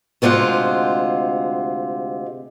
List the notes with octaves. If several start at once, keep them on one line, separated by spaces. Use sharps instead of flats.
D2 C3 G#3 F4 F#5